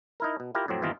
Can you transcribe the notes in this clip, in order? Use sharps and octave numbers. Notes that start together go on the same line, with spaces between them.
D#4 E4 A#4
B2
E4 F4 G4 A#4
F2 A2 F#3 C4
G1 D#2 E3 C4 F4 D#5